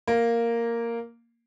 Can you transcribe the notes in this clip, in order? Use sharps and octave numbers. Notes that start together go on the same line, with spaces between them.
A#3